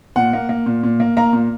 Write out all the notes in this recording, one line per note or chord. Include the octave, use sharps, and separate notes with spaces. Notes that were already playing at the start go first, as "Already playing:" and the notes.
A#2 F#5
A#3
A#3
A#2
A#2
A#3
A#3 A#5
A#2